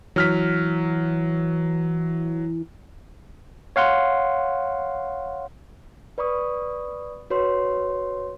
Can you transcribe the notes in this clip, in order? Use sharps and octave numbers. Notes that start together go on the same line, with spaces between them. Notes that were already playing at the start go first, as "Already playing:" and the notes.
E3 F#3 F6 B6
C#5 F5 F#5 C6
B4 D5 B5 C#6 D#6
F#4 B4 C#5 C6